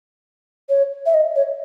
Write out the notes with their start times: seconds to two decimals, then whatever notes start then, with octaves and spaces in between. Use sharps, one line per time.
0.69 C#5
1.06 E5
1.14 D#5
1.36 C#5